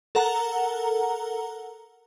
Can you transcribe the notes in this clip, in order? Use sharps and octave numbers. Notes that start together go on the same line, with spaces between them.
A4 A#4 F#5 A#5